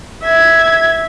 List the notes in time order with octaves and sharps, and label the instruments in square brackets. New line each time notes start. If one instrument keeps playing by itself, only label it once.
[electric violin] E5 G#6